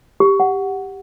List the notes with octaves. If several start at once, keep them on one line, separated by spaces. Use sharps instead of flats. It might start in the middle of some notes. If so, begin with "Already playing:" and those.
G4
F#5